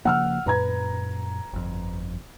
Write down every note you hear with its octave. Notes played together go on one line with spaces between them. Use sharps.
C#3 F3 A#3 F#5 E6 F6
F#2 A#2 B4 A#5 G#6
G1 F2